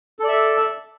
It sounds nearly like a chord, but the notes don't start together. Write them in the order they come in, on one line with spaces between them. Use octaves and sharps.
A4 D5 E5